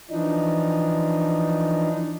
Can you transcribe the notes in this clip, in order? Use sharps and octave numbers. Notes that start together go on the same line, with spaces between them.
E3 F3 D4 D#4